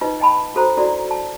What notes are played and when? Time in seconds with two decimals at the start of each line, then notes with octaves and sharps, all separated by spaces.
0.01 D#4 F4 B4 D#5
0.20 D#5 G5 A5 B5
0.55 F#4 A4 C5 A#5
0.77 D4 E4 F#4 A4 D5
1.11 A5